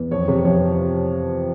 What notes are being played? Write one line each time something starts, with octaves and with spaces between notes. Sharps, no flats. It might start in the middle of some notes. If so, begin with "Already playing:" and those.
Already playing: E2
F2 C#5
C3 C#5
F2 C#5